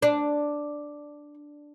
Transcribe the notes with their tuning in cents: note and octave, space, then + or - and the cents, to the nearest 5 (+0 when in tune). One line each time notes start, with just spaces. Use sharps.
D4 +0